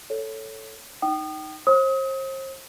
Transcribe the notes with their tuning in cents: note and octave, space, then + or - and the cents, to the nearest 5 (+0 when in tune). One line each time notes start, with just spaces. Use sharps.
A4 +5 C#5 +0
D#4 +0 G5 -25 D#6 -35
C5 +40 D#6 +35